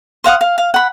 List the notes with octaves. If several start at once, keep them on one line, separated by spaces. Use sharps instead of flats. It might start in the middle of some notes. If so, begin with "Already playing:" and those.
C5 F5 F#5 D#6
F5
F5
F#5 B5